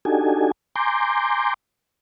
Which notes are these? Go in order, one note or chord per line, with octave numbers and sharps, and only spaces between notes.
D4 D#4 F#4 G4 A4 G#5
G#5 A#5 C6 D6 G6